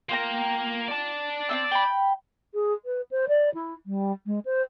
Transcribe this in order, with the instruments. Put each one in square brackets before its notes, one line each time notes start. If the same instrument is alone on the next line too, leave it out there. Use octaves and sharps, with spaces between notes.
[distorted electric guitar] A#3 [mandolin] F4 G5 A#5
[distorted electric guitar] D5 A5
[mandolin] C4 D#4 E6
G5 B5
[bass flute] G#4
B4
C5
D5
E4
G3
G#3
C5